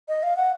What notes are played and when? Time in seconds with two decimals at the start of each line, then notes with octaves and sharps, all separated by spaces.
0.08 D#5
0.23 F5
0.37 F#5